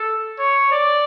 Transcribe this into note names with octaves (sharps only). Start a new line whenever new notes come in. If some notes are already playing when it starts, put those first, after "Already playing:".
Already playing: A4
C#5
D5